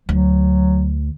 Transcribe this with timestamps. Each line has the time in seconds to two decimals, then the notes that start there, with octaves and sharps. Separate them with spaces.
0.09 D2 F#3